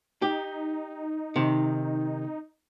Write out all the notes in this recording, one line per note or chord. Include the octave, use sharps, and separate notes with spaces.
D#4 G4
C3 D#3